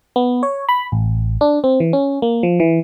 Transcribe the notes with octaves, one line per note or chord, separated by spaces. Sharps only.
B3
C#5
B5
A1
D4
C4
E3
C#4
A#3
F3
E3